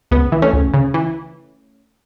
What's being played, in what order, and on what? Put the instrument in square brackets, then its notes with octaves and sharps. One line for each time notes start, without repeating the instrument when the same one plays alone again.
[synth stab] C#2 B3
E3
A3 C#4
C#2
C#3
E3